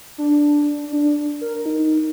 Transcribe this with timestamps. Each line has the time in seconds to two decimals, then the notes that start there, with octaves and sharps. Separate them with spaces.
0.18 D4
0.92 D4
1.41 A#4
1.66 D#4